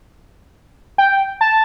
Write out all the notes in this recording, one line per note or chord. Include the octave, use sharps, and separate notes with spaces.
G5
A5